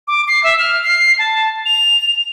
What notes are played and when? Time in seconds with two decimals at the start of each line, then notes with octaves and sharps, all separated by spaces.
0.07 D6
0.28 C7
0.44 E5
0.59 F6
0.84 C7
1.19 A5
1.66 F7